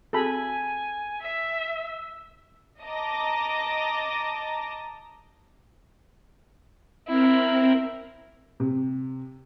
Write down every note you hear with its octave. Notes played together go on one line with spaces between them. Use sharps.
C4 F#4 G#4 A4 G#5 B5
E5 E6
D#5 A5 A#5 D6 A#6
C4 E4 A#4
C3